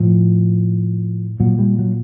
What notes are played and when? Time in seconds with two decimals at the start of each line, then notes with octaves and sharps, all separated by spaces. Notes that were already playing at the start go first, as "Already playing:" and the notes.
Already playing: A2 F3
1.40 A#2 F#3
1.59 G3
1.79 F#3